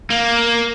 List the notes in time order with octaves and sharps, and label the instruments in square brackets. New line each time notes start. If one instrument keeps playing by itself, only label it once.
[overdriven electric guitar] A#3